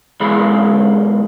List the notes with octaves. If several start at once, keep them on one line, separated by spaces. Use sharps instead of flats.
B1 G#2 E3 G#3 B5